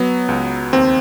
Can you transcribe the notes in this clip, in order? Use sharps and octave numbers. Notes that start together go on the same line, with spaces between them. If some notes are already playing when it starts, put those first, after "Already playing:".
Already playing: F#3 B3
C#2
D#2 C4